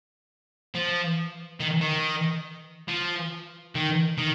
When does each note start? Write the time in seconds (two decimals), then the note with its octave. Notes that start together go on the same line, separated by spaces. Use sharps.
0.75 F3
1.60 D#3
1.81 D#3
2.89 F3
3.75 D#3
4.18 D#3